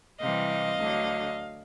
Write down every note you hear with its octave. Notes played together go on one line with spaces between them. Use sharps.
C3 E3 G3 C4 D#5 F5
D2 D3 F#3